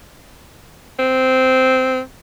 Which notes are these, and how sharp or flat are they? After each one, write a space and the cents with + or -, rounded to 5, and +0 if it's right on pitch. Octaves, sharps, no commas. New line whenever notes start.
C4 -10